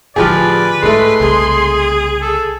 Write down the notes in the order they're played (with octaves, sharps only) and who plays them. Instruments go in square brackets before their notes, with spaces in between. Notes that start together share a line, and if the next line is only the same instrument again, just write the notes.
[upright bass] A2 D3 [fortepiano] F3 G4 G#4 [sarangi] B4 [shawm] D5
[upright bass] G#2 [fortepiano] G#3 A3 [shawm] C6
[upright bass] C2 C#3 [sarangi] G#4
[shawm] A4